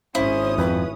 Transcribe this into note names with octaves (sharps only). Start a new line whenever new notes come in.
G#1 C#4 E4 C5 D#6
F2 B4